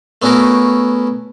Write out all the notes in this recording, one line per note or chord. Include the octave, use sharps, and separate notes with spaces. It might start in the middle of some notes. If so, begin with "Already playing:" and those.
A3 B3 C#4 E4 F#4 A#4